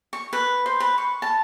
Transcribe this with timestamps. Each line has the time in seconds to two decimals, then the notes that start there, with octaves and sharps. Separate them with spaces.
0.13 C#6
0.33 B4
0.66 C5
0.80 B4
0.98 C#6
1.22 A5